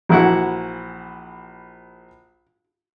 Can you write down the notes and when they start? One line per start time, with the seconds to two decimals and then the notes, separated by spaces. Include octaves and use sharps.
0.09 A#1 E3 E4 F#4 F#5